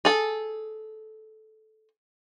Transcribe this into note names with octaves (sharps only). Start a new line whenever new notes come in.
G#4 A4